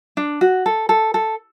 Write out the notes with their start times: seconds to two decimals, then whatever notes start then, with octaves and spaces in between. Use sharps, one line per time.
0.17 D4
0.41 F#4
0.66 A4
0.89 A4
1.14 A4